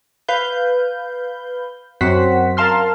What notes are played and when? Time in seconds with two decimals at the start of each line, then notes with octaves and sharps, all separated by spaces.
0.28 B4 F5 G6
2.01 F#2 C4 F#4 C5 F#5 B6
2.57 A#4 F5 A5 C6 F6